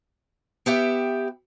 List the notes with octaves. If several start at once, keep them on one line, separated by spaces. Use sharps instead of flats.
B3 G4 E5 G5